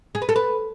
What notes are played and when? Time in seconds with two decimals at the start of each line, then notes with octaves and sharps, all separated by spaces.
0.15 G#4
0.22 B4
0.29 A4
0.36 B4